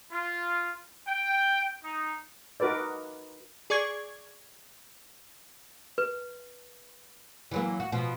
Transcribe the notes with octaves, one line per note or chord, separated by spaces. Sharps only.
F4
G5
D#4
D#4 F#4 A#4 B4 D5
G#4 D5 C#6 G#6
B4
E3 F#3 A#3
F#4
B2 F3